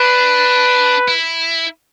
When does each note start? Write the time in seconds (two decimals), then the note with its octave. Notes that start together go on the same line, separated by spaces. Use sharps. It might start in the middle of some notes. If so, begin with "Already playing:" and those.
Already playing: D4 B4
1.08 E4